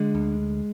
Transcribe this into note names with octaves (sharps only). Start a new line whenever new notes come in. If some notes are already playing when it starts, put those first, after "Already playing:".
Already playing: D3 G#3
D2